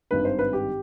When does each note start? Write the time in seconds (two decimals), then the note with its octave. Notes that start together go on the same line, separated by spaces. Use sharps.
0.11 G#1 G2 D#3 B4
0.25 C5
0.39 B4
0.53 G4